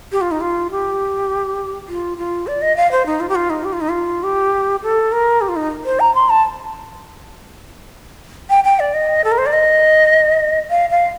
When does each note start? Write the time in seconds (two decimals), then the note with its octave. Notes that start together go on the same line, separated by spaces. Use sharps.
0.12 G4
0.21 F4
0.31 D#4
0.41 F4
0.71 G4
1.88 F4
2.18 F4
2.47 D5
2.62 D#5
2.77 F5
2.92 C5
3.06 D#4
3.20 F4
3.29 G4
3.35 F4
3.50 D#4
3.64 G4
3.73 F4
3.81 D#4
3.89 F4
4.23 G4
4.83 A4
5.12 A#4
5.41 G4
5.49 F4
5.56 D#4
5.85 C5
6.00 A#5
6.15 C6
6.29 A5
8.50 G5
8.64 G5
8.80 D5
8.94 D#5
9.24 A4
9.32 A#4
9.38 C5
9.46 D5
9.53 D#5
10.70 F5
10.90 F5